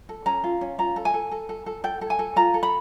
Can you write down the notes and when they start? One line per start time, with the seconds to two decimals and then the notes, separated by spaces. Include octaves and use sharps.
0.09 A4
0.26 C#4 A#5
0.44 F4
0.61 C#4
0.78 F4 A#5
0.96 A4
1.05 G#5
1.14 A4
1.31 A4
1.49 A4
1.66 A4
1.84 A4 G5
2.01 A4
2.10 G#5
2.19 A4
2.36 F4 A#5
2.54 A4
2.63 B5